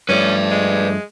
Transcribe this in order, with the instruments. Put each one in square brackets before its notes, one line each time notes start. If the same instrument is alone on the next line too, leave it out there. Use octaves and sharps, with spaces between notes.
[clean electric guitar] G2 F3 A3 [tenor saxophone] C#4 [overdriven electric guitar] B4 D5
[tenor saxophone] G#3